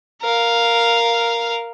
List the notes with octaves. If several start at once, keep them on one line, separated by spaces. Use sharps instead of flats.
A#4 F5